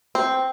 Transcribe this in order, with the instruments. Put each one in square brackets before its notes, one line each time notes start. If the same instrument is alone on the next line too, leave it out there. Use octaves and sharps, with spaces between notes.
[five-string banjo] C4